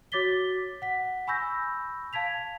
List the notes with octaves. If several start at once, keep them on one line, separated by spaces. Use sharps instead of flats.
F#4 C#5 D6 A6 B6 G7
F#5 B6
G#5 B5 C#6 E6 G6 A#6
F5 A5 G#6 B6 F7